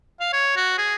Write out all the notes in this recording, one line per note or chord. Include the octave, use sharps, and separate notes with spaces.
F5
C#5
F#4
G#4